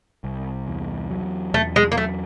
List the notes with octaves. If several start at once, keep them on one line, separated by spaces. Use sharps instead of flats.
C2
E2
F#3
E2 A3
G#3
A#3
F#3 A3